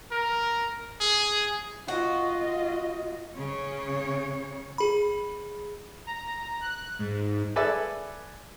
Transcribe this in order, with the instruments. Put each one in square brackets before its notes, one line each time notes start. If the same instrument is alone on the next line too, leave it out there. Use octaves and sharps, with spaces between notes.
[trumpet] A#4
G#4
[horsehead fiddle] F4 D#5 [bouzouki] F#4
[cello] C#3 C#5
[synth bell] G#4 B5
[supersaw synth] A#5
F#6
G#2
[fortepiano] G#4 A4 B4 D5 E5 A5